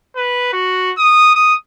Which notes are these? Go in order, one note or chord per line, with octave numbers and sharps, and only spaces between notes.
B4
F#4
D#6
D#6